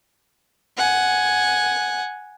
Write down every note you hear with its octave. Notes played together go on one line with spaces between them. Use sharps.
F#5 G#5